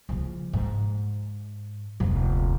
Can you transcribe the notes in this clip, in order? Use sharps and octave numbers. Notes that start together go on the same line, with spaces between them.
C#3 F3
G#2
F1 D2